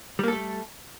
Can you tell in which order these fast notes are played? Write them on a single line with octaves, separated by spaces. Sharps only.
G3 A#3 A4 A3